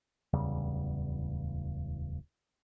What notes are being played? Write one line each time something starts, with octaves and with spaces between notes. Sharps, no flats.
D1 E2 C#3 G3